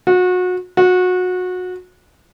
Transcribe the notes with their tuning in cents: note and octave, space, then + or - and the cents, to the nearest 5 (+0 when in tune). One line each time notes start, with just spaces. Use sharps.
F#4 -30
F#4 -25